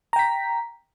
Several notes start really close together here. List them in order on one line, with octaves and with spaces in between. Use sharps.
A#5 G5 B6